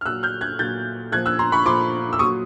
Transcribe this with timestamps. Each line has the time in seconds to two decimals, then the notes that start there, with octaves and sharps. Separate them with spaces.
0.01 F6
0.06 A#2 F#3 E6 F#6
0.23 F6 G6
0.41 F#6 G#6
0.59 A#2 F#3 G6 A6
1.12 A#2 F3 F#6 G#6
1.26 E6 F#6
1.39 A#5 C6
1.52 B5 C#6
1.66 A#2 F3 C6 D6
2.13 E6
2.19 A#2 F#3 C#6 D#6